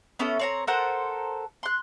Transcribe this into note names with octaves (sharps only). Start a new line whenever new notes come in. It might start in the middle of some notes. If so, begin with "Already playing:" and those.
B3 C#4 E4 A4
C4 C#5 A#5
A4 A#4 C5 F#5
C6 F#6